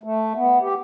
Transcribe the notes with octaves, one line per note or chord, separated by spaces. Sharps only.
A3
B3
G4